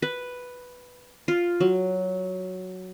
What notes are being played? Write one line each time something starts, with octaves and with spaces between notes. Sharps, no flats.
B4
F4
F#3